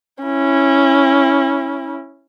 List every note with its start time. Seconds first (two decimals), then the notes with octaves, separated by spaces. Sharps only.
0.23 C#4 E4